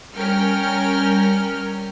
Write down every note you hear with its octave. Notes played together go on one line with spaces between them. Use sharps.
G3 C#4 A#4 G5 F6